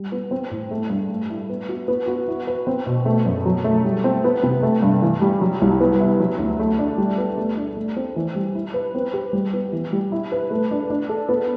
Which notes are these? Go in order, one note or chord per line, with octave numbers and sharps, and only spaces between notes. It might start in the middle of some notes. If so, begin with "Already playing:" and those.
Already playing: G3
B3
C4
A2
A3
G2
A3
E4
B3
F#4
B3
F#4
E4
B4
C4
B2
A3
F#2
F#3
A3
G3
C4
B3
C3
A3
G2
E3
G3
F#3
C2
B3
E4
F#3
D2
A3
D4
G3
B3
A3
D4
A3
C4
E3
G3
E4
B4
C4
G4
G3
B3
E3
G3
E4
B4
A3
D4
D4
A4
B3